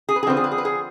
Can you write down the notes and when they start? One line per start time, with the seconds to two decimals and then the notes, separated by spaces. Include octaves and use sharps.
0.09 G#4
0.16 B4
0.23 G#4
0.27 D3 F3 C4 B4
0.37 G#4
0.44 B4
0.52 G#4
0.58 B4
0.65 G#4